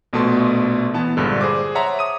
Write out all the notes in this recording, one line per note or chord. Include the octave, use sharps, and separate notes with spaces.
A#1 B2 A3 A5 C6
E3 B3 A5
A#1 G2 D3 G#3
G#4 C5 D6
C#5 E5 F#5 A5 A#5 C6
D#6 D#7